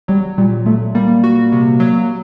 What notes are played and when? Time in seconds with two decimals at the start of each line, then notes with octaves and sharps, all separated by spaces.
0.08 F#3 G3
0.38 A#2 G3
0.66 A#2 A3
0.95 G3 A#3
1.24 F#4
1.52 C3
1.80 F#3